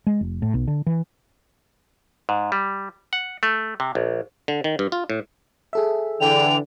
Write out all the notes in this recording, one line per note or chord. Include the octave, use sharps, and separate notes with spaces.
G#3
F1
A2
B1
D3
E3
G#2
G3
F#5
A3
C3
A#1
D3
D#3
G2
F4
A2
G#4 A4 E5
D3 E3 G5 F7